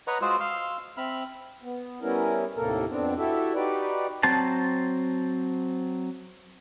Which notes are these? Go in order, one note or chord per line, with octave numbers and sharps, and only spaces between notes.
B4 C#5 D#5 F#5 A#5 C#6
G#3 F4 F#4 G#4 C5 E6
F5 C6 E6 F6
C4 E5 B5 F6
B3
G3 B3 C#4 E4 A#4
D#2 A2 C3 A#3 A4 A#4
F2 B3 C4 D4
E4 F#4 G4 A4 E5
D#4 F#4 G4 B4 D5
F#3 C4 C5 A5